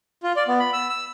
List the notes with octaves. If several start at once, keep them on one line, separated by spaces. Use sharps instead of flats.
F4
D5
B3
B5
E6
E6